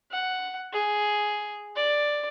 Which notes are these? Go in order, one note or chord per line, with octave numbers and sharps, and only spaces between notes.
F#5
G#4
D5